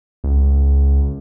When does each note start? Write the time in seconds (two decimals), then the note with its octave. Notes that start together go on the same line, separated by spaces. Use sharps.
0.24 C#2